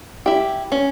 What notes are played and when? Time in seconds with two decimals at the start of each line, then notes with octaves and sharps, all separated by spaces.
0.26 E4 G4
0.72 C#4